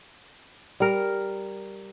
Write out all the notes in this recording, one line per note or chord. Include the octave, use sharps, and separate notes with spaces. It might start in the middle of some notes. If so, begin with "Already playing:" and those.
G3 A#4